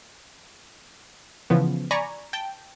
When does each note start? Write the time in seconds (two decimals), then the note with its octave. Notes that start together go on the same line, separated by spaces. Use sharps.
1.50 C#3 E3 F3 B3
1.91 D5 G#5 A#5 B5 C#6
2.33 G5 A5 G6